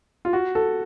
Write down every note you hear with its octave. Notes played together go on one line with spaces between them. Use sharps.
F4
F#4
A4